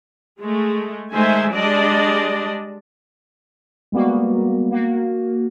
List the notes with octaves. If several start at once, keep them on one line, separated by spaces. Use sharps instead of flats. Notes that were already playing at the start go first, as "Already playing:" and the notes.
G#3 A3
D#3 G#3 A3 C5 E5 G#5
G3 G#3 D4 D5 D#5 A5
G3 G#3 A#3 B3 F#4
A#3 F#4